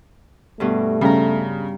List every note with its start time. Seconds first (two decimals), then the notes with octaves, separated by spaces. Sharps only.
0.60 G2 B2 A3
1.01 C#3 G3 A#5